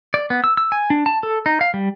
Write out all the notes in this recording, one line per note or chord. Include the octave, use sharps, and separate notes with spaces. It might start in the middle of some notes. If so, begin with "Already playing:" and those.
D5
B3
E6
E6
G#5
D4
A5
A4
D#4
F5
G3